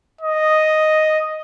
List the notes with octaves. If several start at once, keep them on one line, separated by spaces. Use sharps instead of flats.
D#5